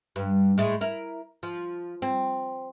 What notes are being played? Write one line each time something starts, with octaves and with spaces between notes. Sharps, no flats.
G2
A2 G#3 A3
E4 A#4
F3
C4